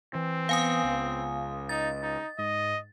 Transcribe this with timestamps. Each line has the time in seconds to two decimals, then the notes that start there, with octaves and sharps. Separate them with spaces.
0.15 E3 C4
0.49 B3 F5 G#5 D#6
0.84 C#2
1.69 D#4 D#5 A6
2.03 D#4
2.38 G#2 D#5